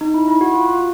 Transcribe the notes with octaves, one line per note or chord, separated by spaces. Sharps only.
D#4
E4
E4
F#4
F4
F4